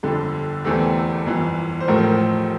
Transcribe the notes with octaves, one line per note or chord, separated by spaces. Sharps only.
G1 F2 D3 A4
E1 E2 E3 A3 C4 G4
G1 F2 E3
C5
A1 A2 F3 A3 A#4
C5
A#4